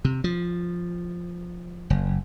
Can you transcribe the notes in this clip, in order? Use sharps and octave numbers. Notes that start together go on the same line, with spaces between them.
C3
F3
F#1